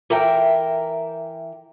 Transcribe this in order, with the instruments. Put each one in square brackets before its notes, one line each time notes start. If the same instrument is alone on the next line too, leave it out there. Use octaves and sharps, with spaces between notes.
[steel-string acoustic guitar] E3 A#4 E5 G5 A5